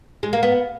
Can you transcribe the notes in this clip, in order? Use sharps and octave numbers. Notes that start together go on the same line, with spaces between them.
G#3
A#3
B3